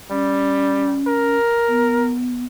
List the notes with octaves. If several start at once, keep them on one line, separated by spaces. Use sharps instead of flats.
G3 C#4
A#4
B3